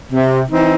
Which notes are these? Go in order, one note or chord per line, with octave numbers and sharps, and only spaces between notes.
C3
E3 C4 D#4